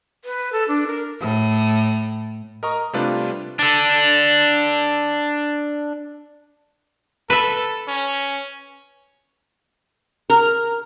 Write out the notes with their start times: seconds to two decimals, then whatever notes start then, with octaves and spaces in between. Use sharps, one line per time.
0.25 B4
0.52 A4
0.68 D4
0.87 A#4
1.20 A2
2.63 A#4 D#5 A#5 C#6
2.93 C3 G3 A3 D4 F4 B4
3.59 D4 A4
7.30 A4 B4 E5
7.88 C#4
10.30 A#4